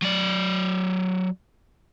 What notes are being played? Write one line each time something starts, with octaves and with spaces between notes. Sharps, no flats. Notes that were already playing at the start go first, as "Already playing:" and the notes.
F#3 D5